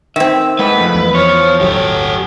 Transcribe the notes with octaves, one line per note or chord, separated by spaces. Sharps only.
D#3 C4 E5
G#3 B4 F#5
F2 A3
E2
F3 C5 C#5
D1 G1 F#3 G4 A4